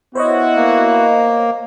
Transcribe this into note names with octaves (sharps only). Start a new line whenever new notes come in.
B3 E4 F#4 C5 C#5 D#5
A#3